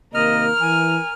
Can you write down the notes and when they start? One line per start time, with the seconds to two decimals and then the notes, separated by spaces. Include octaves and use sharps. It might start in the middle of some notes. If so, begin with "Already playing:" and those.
0.13 C3 D#3 A#3 A#4 D#5 F6
0.61 E3 G#5